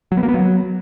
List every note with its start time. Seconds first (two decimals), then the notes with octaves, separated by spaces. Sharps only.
0.12 F#3
0.17 B3
0.23 A#3
0.28 B3
0.34 F#3